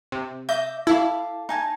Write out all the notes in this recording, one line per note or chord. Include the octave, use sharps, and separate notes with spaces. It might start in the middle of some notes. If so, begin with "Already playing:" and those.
C3
D#5 E5 D6 G6
E4 A4 F5 D6
D#4 G#5 A5